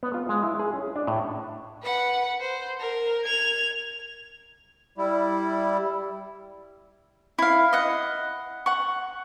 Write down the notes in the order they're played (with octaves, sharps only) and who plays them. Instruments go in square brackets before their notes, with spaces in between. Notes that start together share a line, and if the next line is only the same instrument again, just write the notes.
[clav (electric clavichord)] B3
F4
G#3
E4
G#4
C#4
D4
A2
[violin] B4 F#5
C5
A#4
G#6 F7
[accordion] G3 E4
[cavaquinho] E4 F5
D#5 F#5
F#5 C#6